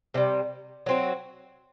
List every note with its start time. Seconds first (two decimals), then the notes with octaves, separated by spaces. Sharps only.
0.14 C3 E3 G3
0.86 F#3 C4 F#4